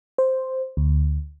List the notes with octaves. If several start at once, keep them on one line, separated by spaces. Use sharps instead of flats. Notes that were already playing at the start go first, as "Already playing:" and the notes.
C5
D2